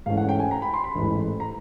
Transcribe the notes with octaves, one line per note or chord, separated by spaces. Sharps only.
G#2 E3 A3 C#4 F5
F#5
G5
G#5
A#5
B5
C6
B5
A1 G#2 E3 A3
A#5